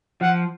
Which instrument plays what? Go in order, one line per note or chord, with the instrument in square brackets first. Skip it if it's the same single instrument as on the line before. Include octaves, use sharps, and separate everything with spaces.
[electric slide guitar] F3 [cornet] F#5